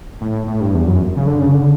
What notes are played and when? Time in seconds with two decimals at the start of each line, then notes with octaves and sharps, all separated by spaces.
0.21 A2
0.47 A2
0.61 G2
0.74 E2
0.87 F#2
1.17 C#3
1.27 D3
1.41 C#3
1.54 D3